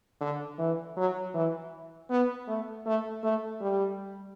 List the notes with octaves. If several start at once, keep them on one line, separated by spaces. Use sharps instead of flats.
D3
E3
F#3
E3
B3
A3
A3
A3
G3